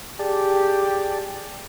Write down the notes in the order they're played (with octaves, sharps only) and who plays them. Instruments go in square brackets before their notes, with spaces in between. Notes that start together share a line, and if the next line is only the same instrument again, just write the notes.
[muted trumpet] G4 [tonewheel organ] G#4 D5 A5